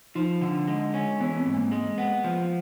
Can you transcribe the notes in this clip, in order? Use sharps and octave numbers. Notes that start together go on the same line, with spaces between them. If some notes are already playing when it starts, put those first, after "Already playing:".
F3 D#4
D3
G#3
C#4
E3 B3
C4
G#2
A#3
G#3
B3
F3